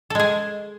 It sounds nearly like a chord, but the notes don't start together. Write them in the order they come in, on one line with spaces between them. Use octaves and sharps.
A4 G#3 G#4